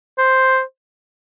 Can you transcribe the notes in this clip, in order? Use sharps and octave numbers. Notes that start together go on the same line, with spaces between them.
C5